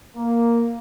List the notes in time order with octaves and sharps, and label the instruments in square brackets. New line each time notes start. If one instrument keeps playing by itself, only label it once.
[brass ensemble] A#3